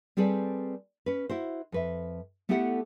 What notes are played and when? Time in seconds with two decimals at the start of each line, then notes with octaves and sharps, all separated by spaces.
0.17 G3 C4 G#4 A4 B4 D5
1.06 C#4 B4
1.29 E4 F#4 C5
1.72 F2 B4 E5
2.49 A3 B3 E4 G4 A4 F#5